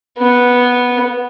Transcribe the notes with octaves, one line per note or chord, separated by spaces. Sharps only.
B3